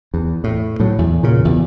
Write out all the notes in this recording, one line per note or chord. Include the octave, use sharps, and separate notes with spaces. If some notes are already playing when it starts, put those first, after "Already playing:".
E2
A2
A2 F#3
E2
A#2 C#3
E2 B2